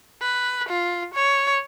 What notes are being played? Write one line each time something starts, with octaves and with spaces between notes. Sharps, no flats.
B4
F4
C#5